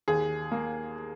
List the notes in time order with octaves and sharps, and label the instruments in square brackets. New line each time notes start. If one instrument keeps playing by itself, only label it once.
[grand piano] D#2 G#4
A#3